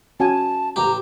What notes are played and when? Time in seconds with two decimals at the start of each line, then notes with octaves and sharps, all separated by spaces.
0.20 C#4 F#4 G#5 A5
0.76 A1 G4 A#5